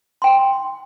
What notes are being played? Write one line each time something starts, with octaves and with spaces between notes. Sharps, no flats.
G5 C6